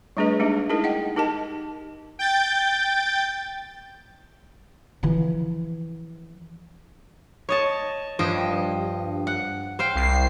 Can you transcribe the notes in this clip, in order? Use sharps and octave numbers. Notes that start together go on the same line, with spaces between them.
G3 A3 D4 G#4 B4 D#5
G#3 A#3 D4 D#4 G4
D#4 E4 G#4 A#4 D#5
D#5 F#5 G5
D#4 G4 A#4 D#5 A5
G5 G6 A6
E3 F3
C#5 D#5 A5
G2 F3 D#5 G5
F#5
C5 F5 G5
C2 C7